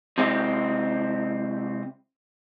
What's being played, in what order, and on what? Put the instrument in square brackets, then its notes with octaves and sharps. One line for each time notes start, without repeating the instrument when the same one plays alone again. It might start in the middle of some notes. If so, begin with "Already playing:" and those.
[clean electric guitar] C3 G#3 C4 E4 G4